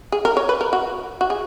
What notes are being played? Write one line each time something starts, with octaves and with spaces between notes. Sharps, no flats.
G#4
A#4
C#5
B4
A#4
F#4
F#4
G#4